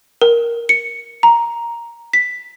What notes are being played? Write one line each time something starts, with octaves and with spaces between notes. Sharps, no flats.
A#4
C#7
A#5
B6